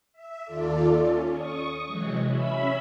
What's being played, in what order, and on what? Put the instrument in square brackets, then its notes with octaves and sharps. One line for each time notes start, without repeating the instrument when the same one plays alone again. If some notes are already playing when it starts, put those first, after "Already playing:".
[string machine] E5
D#2 F4 A4 D5
C#4
C#6 D#6
C3 E3 F#3 G#3
C#4 E5 B5